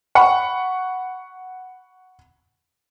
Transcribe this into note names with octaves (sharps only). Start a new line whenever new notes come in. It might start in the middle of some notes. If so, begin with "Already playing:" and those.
F#5 B5 C#6